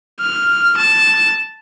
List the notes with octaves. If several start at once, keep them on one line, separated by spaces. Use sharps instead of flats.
F6
A5